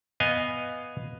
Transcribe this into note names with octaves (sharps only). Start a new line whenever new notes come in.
B3 D#5 F5 G#5